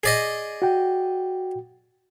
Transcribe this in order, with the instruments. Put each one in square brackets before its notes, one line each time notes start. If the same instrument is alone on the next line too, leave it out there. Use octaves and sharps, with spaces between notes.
[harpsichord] G#4 D5 D#5
[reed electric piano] F#4 G5